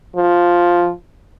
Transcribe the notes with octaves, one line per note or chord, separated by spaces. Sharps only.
F3